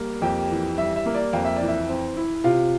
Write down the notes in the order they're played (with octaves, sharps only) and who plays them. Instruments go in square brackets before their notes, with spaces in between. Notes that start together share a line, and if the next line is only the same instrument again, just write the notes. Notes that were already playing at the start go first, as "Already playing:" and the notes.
Already playing: [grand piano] G3 A#3
F2 G4 G5
E3
G3 E5
E5
A#3
D5
F2 F5
E5
E3 D5
E5
C4
E4
C3 F4 F5